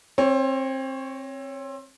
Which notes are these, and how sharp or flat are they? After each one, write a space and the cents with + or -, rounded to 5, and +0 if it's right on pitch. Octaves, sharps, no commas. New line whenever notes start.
C4 +25 C#5 +0